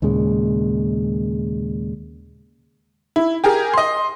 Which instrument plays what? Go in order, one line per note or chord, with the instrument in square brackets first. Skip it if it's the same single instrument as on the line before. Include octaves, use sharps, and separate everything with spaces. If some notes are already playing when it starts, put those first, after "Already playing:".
[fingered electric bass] D#2 A#2 C#3 G#3
[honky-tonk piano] E4
G4 G#4 A#4
D#5 C6